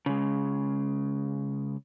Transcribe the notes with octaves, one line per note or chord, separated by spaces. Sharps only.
C#3 G#3